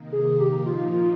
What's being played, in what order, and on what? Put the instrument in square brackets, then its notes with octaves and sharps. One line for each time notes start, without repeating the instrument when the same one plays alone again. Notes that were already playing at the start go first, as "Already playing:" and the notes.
Already playing: [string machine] C3 D#3 A#3 D#4
[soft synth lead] G#4
[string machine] A#2 F3 A#3 D#4 [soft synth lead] G4
[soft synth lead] F4
F4